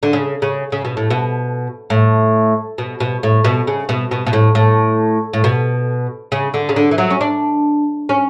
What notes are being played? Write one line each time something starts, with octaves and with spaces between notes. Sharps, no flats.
D3
C#3
C#3
C#3
B2
A2
B2
A2
B2
B2
A2
B2
C#3
B2
B2
B2
A2
A2
A2
B2
C#3
D3
C#3
D3
E3
F#3
C#4
D4
C#4